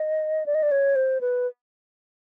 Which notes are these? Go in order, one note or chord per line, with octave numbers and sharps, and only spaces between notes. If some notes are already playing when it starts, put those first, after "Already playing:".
Already playing: D#5
D5
D#5
D5
C#5
C5
B4